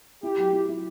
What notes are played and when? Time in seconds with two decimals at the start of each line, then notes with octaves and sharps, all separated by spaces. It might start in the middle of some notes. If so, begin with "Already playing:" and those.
0.23 E4 G4
0.38 F#3
0.53 E4
0.69 E4